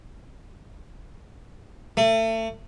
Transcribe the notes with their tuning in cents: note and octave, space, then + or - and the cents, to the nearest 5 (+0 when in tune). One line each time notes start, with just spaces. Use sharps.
A3 +30